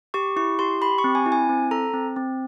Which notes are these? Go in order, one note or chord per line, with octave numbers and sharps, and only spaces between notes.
G4 C#6
E4 C#6
G4 C6
G4 B5
C#6
C4
G#5
E4
G#5
C4
A4 A#5
C4
C4